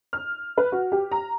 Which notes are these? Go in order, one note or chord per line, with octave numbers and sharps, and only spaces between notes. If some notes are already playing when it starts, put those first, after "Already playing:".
F6
B4
F#4
G4
A#5